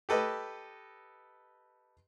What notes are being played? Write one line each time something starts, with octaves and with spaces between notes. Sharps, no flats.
G4 A4 B4 D#5